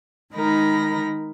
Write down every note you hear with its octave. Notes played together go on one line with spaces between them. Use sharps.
D#3 G#3 D#4 A#4 B5 A#6